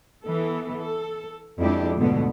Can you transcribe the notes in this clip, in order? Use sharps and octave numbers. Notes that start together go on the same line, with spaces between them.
E3 B3 A4
A4
F2 G#3 D4 E4 G4
D2 G#2 B2 D3 B3